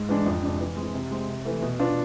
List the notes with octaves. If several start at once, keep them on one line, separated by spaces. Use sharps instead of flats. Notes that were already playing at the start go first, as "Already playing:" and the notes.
Already playing: G#2
E3 G#3 D4
F2
C3 G#3 D4
E3
G#3 C4 E4
C3
G#3 C4
C3
E3 A3
B2
B3 D4 F4